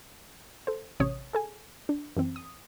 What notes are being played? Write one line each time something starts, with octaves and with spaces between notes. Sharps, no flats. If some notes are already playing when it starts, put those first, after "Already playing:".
A4 C5
A1 C3 C#4 C#5 D#6
G#4 A4 G#5
D4
F#2 E3 C4
D#6